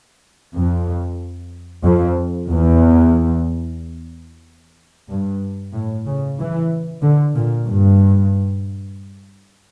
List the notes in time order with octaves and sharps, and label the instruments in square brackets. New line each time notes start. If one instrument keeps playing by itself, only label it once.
[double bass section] F2
F2
E2
G2
A2
C#3
E3
D3
A#2
G2